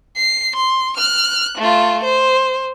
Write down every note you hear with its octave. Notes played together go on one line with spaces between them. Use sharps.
C7
C6
F6 F#6
A3 F4
C5